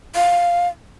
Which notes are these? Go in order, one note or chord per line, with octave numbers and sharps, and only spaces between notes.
F5